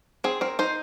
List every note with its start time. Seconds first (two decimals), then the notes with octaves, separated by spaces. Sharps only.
0.24 C4 G#4
0.41 C4 A#4
0.59 D#4 C5